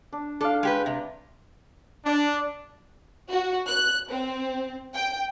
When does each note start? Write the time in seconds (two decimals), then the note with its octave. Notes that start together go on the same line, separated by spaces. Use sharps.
0.13 D4
0.41 D4 A4 D5 F5
0.63 G#3 G4 B4
0.86 C3
2.05 D4
3.31 F#4
3.68 F#6
4.09 C4
4.95 G5